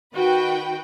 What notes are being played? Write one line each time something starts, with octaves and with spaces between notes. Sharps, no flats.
D#3 F#4 B4 G5